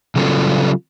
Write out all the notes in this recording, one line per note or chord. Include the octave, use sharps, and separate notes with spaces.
C#3 F#3 G3 C#4 F4 A4